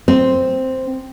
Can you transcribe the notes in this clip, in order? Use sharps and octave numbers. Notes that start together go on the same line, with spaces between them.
C4